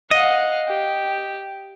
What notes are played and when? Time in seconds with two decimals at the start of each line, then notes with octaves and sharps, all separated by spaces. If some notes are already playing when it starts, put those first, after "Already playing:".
0.11 D#5 F5 F#5
0.67 G4